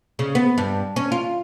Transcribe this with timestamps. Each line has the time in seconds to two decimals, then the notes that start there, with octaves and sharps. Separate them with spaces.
0.19 C#3
0.35 B3
0.58 G2
0.96 C#4
1.12 F4